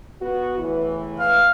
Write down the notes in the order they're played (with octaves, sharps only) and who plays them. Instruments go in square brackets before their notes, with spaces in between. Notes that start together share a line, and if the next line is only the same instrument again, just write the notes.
[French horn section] B3 F#4
E2 A2 E3
[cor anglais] F5